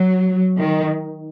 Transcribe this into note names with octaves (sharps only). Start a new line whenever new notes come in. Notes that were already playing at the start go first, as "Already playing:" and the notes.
Already playing: F#3
D#3